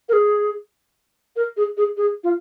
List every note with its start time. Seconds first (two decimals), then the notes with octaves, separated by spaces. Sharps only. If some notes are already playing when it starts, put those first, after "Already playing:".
0.09 A#4
0.13 G#4
1.36 A#4
1.57 G#4
1.77 G#4
1.97 G#4
2.24 F4